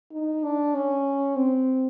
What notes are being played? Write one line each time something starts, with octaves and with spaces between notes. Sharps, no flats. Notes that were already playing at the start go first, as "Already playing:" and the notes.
D#4
D4
C#4
C4